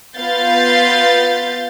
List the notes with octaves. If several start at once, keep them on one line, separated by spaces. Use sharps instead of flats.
B3 F4 F5 G6 A6 C7